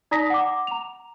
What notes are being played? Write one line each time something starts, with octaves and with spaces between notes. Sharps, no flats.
D#4 D5 A#5 D#6 A#6 B6
F#5 D6
A#5 F7